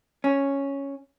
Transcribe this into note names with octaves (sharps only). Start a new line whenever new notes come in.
C#4